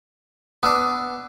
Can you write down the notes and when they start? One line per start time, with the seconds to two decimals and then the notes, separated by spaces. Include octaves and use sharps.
0.63 B3 D4 D#6 E6